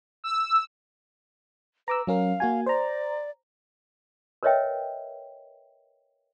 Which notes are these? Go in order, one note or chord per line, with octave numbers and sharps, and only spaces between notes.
E6
B4 A#5 D6 E6
F#3 C#4 A#4 F5
A#3 F#4 G#5
C5 D5 A#5
A#4 B4 C#5 D#5 E5 G5